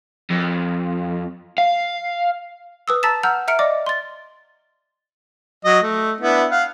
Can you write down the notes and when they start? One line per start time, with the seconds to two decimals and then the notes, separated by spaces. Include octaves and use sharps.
0.30 F2
1.58 F5
2.88 B4 D#6 E6
3.03 A5 A#5 E6 A6 B6 E7
3.23 F#5 A#5 E6 F6 G6
3.48 E5 A#5 F6 C#7 D7
3.59 D5 D#5 D6
3.86 C6 A6
5.65 F#3 D#5
5.82 A3
6.21 B3 D4 E4
6.50 F5 F#5